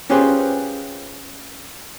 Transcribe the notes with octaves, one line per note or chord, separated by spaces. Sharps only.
C#4 F4 G4 G#4 B4 C5